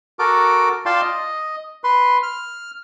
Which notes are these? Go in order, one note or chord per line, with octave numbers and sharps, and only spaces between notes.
F#4 A4 A#4 D6
F4 D5 F5 G5 A5 C6
D#5
B4 C6
F6